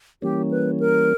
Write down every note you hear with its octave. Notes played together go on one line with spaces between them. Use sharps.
E3 G3 A#3 C#4 G4
B4
A#4